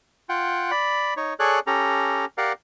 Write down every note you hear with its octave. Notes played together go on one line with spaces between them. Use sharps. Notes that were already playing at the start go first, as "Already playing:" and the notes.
F4 F#5 G5
D5 B5
D#4 C#5
G#4 A4 C#5 D5 F#6
C#4 G4 A4 A#5
G4 A#4 D5 F5 F#5